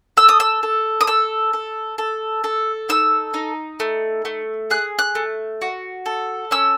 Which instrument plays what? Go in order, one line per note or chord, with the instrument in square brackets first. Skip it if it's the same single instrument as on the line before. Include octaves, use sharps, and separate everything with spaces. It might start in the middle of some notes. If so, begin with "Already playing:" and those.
[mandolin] A4 E6
D#6
E6
A4
D#6
A4 E6
A4
A4
A4
D#4 E6
D#4
A3
A3
G#4 F#6
F#6
A3
F#4
A4
C#4 E6